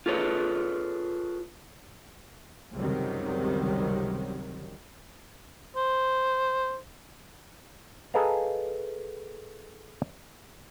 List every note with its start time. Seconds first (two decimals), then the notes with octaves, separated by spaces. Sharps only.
0.06 F4 G#4 A4 B4 C#5
2.74 C#2 F#2 C3 D#3 F#3 G3
5.76 C5
8.14 G#4 A4 B4 D#5 F5 A#5